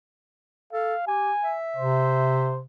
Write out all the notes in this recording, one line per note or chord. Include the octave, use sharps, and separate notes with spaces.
A4 F5
G4 G#5
E5
C3 C5